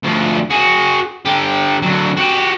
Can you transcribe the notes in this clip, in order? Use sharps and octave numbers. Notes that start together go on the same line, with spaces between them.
D2 F3
F#4 G#4
D3 G4
D3 F#3
F#4 G4